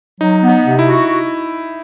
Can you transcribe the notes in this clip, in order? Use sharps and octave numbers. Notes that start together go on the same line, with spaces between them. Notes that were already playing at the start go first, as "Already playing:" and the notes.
F#3 D#4
B3
D#4
C3
E4
F#4